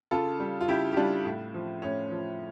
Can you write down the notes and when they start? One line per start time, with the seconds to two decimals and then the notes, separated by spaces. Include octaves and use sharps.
0.11 C#3 F4 A4
0.40 G3
0.61 F4
0.68 C#3 E4 G4
0.92 G4
0.96 G3 D4 F4
1.25 A2
1.54 F3
1.82 A2 C#4
2.11 F3